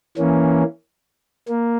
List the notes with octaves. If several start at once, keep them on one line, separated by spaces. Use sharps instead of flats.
E3 A#3 C#4
A#3